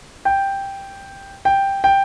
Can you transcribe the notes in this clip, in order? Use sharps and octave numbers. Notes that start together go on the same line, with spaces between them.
G5
G5
G5